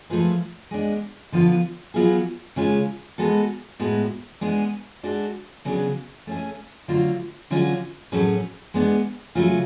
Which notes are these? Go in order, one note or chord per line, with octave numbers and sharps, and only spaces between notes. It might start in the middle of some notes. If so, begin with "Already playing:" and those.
F3 A3 F4 G#4 B4
G#3 B3 D4
D3 F3 B3 F4 B4
F#3 B3 F4 G#4
C#3 G#3 C#4 F4
G#3 B3 F#4 A4
A2 G#3 B3 F#4
G#3 B3 D4 G#4
G#3 D4 F#4 A4
C#3 F#3 B3 D4 G#4
A3 C#4 G#4
D3 F#3 A3 F4
D3 F#3 C#4 F4 G#4
A2 F#3 C#4 G#4 B4
G#3 B3 D4
C#3 F#3 A3 F4 G#4